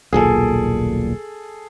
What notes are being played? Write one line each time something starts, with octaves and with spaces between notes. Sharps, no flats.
D#1 B1 A#2 G#4 A4